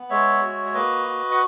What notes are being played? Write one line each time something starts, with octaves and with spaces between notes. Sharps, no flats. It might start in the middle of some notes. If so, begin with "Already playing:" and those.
Already playing: B3
G#3 C#5 E5
F#4
C#5
A#3 B4 D#5
F#4
F#5